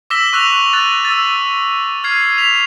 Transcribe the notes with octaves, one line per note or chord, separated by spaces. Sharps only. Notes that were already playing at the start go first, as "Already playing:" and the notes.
D6 E6 A#6 B6 E7 G7
C#6 E6 F#6 A#6 E7 F7
F#6 A6 D#7
E6 A6
F6 G#6 C7
B6 F7